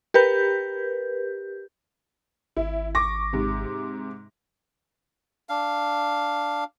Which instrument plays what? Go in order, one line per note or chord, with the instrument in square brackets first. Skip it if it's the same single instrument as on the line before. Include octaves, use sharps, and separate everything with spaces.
[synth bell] G4 A#4 B4 G6
[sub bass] G#1 [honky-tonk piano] E4
[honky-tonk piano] C#6 [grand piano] D6 A#6
[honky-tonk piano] G#2 C3
[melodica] D4 F5